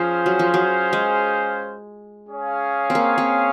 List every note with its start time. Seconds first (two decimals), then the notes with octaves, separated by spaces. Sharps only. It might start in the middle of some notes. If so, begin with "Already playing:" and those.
Already playing: F3 C#4 G#4 C5 F5
0.26 F#3
0.39 F3
0.54 F#3
0.93 G#3
2.28 C#4 G#4 C#5 F5
2.90 C4
2.95 A#3
3.18 C4